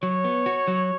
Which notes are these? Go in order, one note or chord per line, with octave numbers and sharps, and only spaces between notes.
F#3 C#5
B3
F#4
F#3